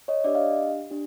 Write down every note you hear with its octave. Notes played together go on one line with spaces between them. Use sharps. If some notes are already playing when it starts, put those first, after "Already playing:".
C#5 D#5
D4 G4 D5 E5
D#5 F5
D4 G4